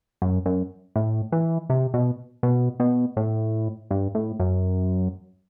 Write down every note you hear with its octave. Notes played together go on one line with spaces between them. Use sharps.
F#2
F#2
A2
E3
C3
B2
B2
B2
A2
G2
A2
F#2